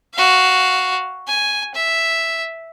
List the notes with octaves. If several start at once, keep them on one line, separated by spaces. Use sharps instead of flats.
F#4 F5
G#5
E5